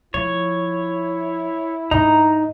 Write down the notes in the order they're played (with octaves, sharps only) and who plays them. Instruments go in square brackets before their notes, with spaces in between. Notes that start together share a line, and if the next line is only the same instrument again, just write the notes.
[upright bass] F3 [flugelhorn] E4 [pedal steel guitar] C#5
[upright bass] G#2 D4 [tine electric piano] D#4 [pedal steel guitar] A#5